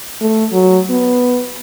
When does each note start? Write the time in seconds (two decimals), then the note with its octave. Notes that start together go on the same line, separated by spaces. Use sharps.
0.21 A3
0.52 F#3
0.90 B3